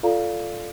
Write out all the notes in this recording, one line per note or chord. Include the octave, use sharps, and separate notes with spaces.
F4 A4 D5 F5 A#5